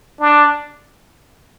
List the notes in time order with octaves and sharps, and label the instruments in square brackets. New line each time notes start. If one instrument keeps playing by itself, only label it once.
[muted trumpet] D4